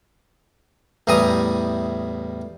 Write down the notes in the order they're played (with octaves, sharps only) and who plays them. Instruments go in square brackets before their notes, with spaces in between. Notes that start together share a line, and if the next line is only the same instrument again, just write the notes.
[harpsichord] E2 A2 G3 G#5 A#5 D#6